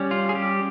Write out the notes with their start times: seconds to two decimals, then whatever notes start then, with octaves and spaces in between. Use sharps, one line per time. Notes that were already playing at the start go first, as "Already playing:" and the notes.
Already playing: G3 C#4
0.11 F4
0.29 G#4
0.35 G4